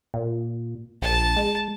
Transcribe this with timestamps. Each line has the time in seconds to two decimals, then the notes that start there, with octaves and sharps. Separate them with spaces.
0.14 A#2
1.02 A#1 A5
1.37 G#3